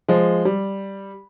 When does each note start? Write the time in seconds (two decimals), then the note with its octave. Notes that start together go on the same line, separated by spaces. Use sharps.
0.08 F3 G#3
0.45 G3